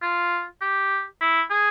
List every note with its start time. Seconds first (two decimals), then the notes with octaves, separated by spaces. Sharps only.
0.02 F4
0.61 G4
1.21 E4
1.51 G#4